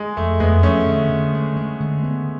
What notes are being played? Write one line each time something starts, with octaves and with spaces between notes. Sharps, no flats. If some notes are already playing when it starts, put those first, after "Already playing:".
Already playing: G#3
F2 A3
F2 G#3 B3
F3 A3 C#4
D3
D3
G#3
G#3
D3
B3